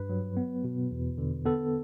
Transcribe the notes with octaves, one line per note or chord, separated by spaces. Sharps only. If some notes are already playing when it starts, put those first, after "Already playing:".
Already playing: G2 B4
F#3
B3
B2
E2
D3
B3 A4